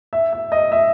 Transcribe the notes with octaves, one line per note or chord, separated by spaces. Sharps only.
E5
E5
D#5
E5